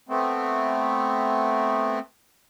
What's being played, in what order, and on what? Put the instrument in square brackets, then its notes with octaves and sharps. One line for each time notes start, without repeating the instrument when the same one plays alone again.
[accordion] A3 B3 C4